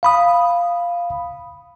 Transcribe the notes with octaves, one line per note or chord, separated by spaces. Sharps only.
F5 B5 D#6